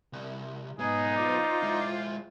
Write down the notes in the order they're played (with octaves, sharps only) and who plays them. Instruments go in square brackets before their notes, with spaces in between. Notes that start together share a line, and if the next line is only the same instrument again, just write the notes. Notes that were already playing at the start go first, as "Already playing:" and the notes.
[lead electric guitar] C2
[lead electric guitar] B1 B3 [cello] G#2 [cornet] D#4 [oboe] G#4
[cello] F4 C5 [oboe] D5
[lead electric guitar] G#3 E4